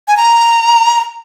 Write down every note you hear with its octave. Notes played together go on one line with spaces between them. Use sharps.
G#5
A#5